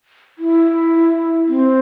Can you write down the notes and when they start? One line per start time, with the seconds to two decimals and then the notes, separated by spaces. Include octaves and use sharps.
0.39 E4
1.48 C4